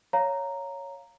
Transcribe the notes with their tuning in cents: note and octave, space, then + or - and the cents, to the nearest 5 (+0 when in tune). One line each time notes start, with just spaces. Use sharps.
C#5 +0 F5 +0 A#5 -5